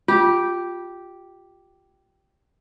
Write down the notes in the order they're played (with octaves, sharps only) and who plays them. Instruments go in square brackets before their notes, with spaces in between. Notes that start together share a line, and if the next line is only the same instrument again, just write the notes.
[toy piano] F4 [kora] G4